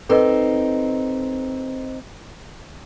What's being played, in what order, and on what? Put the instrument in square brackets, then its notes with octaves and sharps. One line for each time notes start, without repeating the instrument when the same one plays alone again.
[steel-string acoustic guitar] C4 D#4 [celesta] A4 B4 D#5